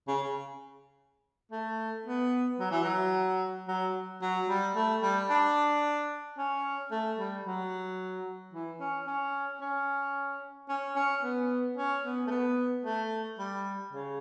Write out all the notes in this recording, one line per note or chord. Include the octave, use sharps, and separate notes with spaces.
C#3
A3
B3
F#3
E3
F#3
F#3
F#3
G3
A3
G3
D4
C#4
A3
G3
F#3
E3
C#4
C#4
C#4
C#4
C#4
B3
C#4
B3
A3
B3
A3
G3
C#3